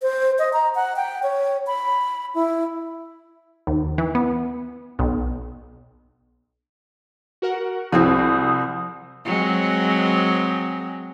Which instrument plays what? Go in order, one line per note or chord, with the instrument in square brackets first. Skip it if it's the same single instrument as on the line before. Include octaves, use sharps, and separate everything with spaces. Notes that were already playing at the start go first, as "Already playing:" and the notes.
[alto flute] C5
D#5
A#5
F#5
G5
C#5
B5
E4
[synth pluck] D#2
E3
B3
B1
[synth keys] F#4 A#4 F#5
[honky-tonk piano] C2 C4 [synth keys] F3 [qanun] E4 F#4 G#4 [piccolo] D#6
[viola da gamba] F#3 G#3 C4